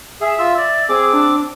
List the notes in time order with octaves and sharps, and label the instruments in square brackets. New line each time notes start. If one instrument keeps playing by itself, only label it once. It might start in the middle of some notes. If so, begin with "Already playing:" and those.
[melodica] G#4 [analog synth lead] E5
[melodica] F4 E6
D5
[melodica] C4 D6 [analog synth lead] G#4
[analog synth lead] D4